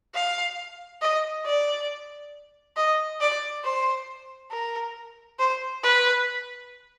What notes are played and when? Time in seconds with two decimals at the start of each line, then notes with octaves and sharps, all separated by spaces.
0.14 F5
1.02 D#5
1.46 D5
2.76 D#5
3.21 D5
3.64 C5
4.51 A#4
5.39 C5
5.83 B4